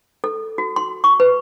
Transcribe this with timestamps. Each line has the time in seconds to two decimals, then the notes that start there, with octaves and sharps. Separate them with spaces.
0.24 A4
0.58 F#4
0.76 C6
1.04 C#6
1.20 B4